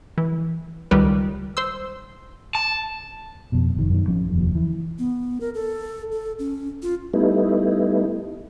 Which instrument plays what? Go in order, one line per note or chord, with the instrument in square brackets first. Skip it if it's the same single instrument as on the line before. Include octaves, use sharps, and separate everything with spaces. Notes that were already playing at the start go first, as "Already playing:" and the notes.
[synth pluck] E3
C#2 D#3 G3 A#4 B4
C5 C6 E6
[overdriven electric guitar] A5
[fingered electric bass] F2 B2
F#1 D#3
F#2 D#3
A1 F3 C4 C#4
F1 D#2 F3
E3
[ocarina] B3
A#4
A4
A4
C#4
F4
[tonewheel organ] G3 A3 B3 D#4 E4